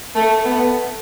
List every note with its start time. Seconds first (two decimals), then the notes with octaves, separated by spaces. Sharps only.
0.15 A3
0.45 B3